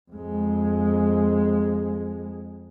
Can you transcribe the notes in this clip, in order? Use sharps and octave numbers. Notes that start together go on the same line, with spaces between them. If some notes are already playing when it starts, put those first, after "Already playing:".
F2 G#3